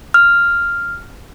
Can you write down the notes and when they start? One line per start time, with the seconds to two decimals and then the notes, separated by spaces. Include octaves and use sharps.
0.14 F6